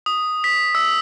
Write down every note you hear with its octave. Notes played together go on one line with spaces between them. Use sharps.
D#6
B6
E6